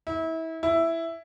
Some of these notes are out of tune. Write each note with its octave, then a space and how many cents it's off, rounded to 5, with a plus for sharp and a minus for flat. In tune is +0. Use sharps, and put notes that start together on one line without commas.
E4 -30
E4 +5